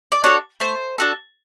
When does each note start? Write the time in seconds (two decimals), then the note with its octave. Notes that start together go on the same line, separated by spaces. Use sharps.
0.12 D5
0.24 D4 F#4 A4 C#5
0.60 A3 C5
0.98 D4 F#4 A4